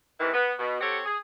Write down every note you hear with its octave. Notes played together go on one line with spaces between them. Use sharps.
C3 D#3 E3
B3
B2
C4 G4 A4 C#5 F#5
G#4